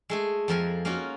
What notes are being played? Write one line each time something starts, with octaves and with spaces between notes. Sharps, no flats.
G#3 A3 G#4
F2 F3 A#4 G#5
A#3 C#4 D#4 F4 F#4